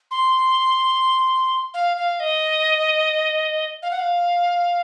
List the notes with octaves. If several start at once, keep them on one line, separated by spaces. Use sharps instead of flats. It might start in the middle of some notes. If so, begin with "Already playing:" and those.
C6
F5
F5
D#5
F5
F#5
F5